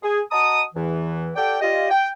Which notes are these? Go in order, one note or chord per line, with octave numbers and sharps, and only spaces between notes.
G#4
F#4 D#5 A5 A#5 D#6
E2 E3
G4 A4 D5 F#5 G5
F4 G4 D5 D#5
G5